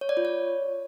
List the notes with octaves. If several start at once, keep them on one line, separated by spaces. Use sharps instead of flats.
C#5
D5
F4
C#5